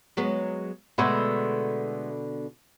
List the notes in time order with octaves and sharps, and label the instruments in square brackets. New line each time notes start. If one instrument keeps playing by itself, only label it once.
[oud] F#3 G#3 B3
[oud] B2 D3 [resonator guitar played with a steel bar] G#3 A3 B3